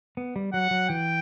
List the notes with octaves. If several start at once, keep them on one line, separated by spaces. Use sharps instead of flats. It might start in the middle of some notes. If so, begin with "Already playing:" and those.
B3
G3
F#3 F#5
F#3
E3 G5